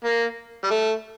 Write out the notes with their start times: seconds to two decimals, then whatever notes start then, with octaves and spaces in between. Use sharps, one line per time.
0.04 A#3
0.64 G3
0.71 A3